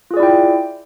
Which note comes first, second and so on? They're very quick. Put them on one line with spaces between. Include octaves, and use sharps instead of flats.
F4 G#4 D5 E4 G5